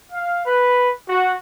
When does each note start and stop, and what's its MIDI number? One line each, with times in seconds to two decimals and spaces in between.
0.11 0.43 77
0.46 0.91 71
1.09 1.30 66